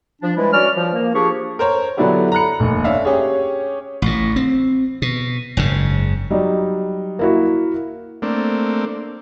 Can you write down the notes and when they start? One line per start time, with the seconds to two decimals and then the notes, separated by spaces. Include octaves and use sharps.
0.22 F3 D4
0.36 E3 G3 G#3 E4 B4
0.53 C#4 F#4 D5 F6
0.76 F3
0.93 A#3
1.14 F3 D4 G4 G#4 C#6
1.59 A#4 C5 C#5
1.97 D3 F#3 B3 D4 E4 G4
2.32 A#5 B5 F#6 C#7
2.60 F1 D#2
2.84 C#4 D4 E5 F5
3.05 C#4 G4 G#4 C#5
4.02 A1 A2
4.36 C4
5.02 B2
5.57 F#1 G#2 C#3
6.30 F#3 G3 D#4
7.19 A#3 E4 F#4
8.22 A3 A#3 C4 D4